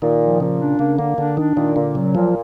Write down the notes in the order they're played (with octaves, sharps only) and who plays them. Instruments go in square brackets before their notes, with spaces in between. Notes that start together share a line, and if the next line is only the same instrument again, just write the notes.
[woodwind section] A#2 [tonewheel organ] D#3
[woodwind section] F3
[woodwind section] A#2 [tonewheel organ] C#3
[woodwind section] D4
[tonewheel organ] C#3 [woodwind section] A#3
[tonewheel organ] D3 [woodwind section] A#3
[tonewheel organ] D3 [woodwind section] D4
[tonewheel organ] D#3 [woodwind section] D4
[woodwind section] A#2 [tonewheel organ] D#3
[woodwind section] A#2 [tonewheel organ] D3
[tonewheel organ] C#3 [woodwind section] F#3
[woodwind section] A#2 [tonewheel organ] F3